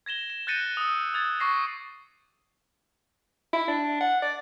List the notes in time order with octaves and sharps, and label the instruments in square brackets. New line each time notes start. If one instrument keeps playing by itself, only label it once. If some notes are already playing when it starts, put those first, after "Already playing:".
[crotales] G#6 A#6 E7 G7
E7
F#6 G6 A6 A#6 C#7 D#7
D#6 E6
D#6 G#6 A6
C#6 D6 A#6 C7
[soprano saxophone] E4
D4
F#5
D5